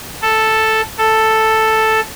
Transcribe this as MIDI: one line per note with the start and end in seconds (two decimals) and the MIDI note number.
0.22 0.81 69
0.98 2.00 69